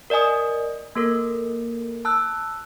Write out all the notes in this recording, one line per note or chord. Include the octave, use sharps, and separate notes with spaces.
A#4 D5 D#5 G#5 D#6
A#3 A4 A#4
A5 E6 F#6